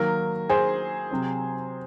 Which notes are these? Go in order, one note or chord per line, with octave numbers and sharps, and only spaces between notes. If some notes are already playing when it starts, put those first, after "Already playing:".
Already playing: D#3 F#3 A#3 A#4
G#4 C5
C3 F#3 C4